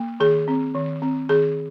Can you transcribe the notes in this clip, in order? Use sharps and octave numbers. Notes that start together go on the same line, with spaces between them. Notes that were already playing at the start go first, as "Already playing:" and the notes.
Already playing: A#3
D#3 G#4
C4
D#3
C4
D#3 G#4